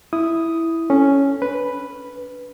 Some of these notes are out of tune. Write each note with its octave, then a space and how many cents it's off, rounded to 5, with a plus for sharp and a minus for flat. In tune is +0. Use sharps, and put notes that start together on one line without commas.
E4 +0 D#6 +0
C#4 +0 A4 +0
D4 -25 B4 +0